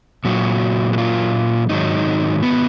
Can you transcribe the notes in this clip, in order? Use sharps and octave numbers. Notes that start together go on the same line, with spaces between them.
A#2 F#3 F#4
F#4
F4
G#2 D#3 F#3 D#4
B3